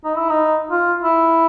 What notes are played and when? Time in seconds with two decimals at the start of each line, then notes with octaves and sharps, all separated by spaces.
0.04 D#4
0.16 E4
0.30 D#4
0.70 F4
1.02 E4